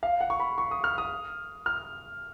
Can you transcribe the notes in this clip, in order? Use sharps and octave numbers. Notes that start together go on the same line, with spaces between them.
F5
F#5
C#6
B5
C#6
D#6
F6
D#6
F6